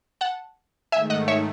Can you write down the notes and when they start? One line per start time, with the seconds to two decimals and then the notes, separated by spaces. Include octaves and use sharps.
0.21 F#5 A5
0.92 G#2 D#3 A3 E5 G#5
1.10 D#5 F#5
1.28 C#5 E5